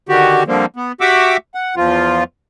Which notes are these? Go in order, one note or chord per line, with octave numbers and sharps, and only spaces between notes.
D3 D#3 F#4 G4
D3 F3 G3 A#3 C4
B3
F#4 G4 E5 F#5 D6 E6
F#5
E2 F3 F4